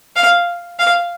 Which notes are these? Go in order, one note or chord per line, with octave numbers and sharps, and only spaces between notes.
F5
F5